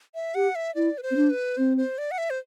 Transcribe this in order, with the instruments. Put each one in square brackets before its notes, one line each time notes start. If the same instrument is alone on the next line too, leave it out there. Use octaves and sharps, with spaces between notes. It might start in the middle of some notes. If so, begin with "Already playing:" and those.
[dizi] E5
[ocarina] G4 [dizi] F#5
[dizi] E5
[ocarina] E4 [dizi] D5
[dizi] B4
C5
[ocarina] C4
D4
[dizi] B4
[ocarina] C4 [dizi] C5
[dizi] C5
D5
F#5
E5
C5